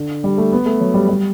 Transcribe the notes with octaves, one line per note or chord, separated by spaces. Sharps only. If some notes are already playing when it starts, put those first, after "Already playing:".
Already playing: D3
G3
A3
B3
A3
F#3
G3
G3